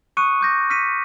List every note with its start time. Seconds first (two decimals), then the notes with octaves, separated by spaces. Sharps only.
0.17 C#6 D#6 F#6 C#7 D#7
0.41 D6 G6 A#6
0.70 F6 A#6 B6 C#7 D#7